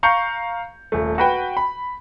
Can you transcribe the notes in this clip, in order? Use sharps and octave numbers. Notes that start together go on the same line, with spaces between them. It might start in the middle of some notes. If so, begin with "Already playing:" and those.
F5 A#5 C#6 G6 C#7
D#1 A3
F#4 B4 G5
B5